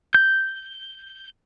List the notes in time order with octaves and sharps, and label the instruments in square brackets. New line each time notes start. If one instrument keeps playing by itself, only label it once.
[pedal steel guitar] G6